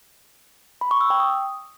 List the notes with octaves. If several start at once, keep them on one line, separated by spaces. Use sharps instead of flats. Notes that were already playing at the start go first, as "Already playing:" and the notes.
B5
C#6
E6
G5
D#6